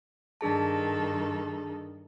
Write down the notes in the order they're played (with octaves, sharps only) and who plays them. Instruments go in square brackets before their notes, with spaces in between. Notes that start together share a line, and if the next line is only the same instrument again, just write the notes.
[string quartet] G2 D#3 A4 [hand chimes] D4 G#4 A5